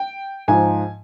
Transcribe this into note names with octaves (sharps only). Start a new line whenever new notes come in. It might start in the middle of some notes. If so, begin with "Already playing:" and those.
Already playing: G5
G#2 F3 G#5